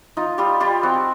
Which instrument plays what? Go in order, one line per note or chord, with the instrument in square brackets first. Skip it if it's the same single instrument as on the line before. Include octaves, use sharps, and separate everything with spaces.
[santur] D#4 F4
G3 F4 G4
G3 F4 G4
C4 F#4